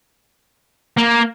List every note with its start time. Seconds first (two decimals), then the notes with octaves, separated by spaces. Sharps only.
0.97 A#3